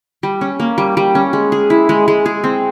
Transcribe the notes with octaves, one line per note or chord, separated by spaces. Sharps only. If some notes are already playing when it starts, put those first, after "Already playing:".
G3
C#4
A#3
G3
G3
C#4
G#3
G#4
E4
G#3
G#3
G#4
C4